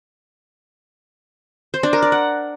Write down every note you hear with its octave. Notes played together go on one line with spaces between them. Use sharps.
C5
D4
A#4
D5
F#5